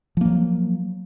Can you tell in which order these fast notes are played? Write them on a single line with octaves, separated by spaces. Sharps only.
F3 A#3 F#3